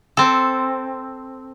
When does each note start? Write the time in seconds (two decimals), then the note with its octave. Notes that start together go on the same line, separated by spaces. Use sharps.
0.17 C4 A4